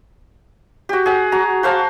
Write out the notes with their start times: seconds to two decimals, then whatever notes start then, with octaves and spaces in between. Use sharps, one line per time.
0.89 F#4 G4
1.06 G#4 F#5
1.32 F#4 A#5
1.63 F#4 C5 F5 A5